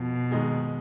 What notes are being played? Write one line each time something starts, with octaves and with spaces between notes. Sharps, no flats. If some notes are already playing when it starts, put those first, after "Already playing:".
Already playing: F2 B2
D#3 G#3 D#4 G#4